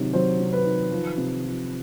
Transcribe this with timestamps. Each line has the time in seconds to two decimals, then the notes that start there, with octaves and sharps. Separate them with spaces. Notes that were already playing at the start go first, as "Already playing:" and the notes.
Already playing: C3 D#3 F#3
0.13 F#3 C5
0.40 C3
0.53 B4
0.66 D#3
0.91 F3
1.18 C3
1.44 F3